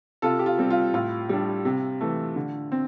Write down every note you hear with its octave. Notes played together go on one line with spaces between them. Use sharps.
C3 F4 A4
G4
F4
G3 C4
F4
A2 F4
G3 D4
C3
E3 A3
D3
C4